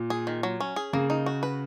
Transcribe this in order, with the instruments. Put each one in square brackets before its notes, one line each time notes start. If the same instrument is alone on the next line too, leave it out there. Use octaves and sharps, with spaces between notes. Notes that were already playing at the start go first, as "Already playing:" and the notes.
Already playing: [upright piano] A#2
[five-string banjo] G#4
D#3
F#3
C#4
G#4
[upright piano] C#3 [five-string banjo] A#3
[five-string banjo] D#4
F#4
B4